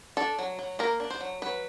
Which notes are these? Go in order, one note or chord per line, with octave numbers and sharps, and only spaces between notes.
D4 A4
F#3
F#3
A#3 A#4
D4
C5
F#3
F#3 B4